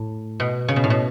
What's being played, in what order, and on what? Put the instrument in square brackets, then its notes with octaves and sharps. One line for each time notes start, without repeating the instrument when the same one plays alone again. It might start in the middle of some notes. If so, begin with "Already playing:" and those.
Already playing: [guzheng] A2
B2
C#3
B2
A2
B2